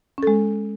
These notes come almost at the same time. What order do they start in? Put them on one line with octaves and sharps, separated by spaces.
C#4 A4 G#3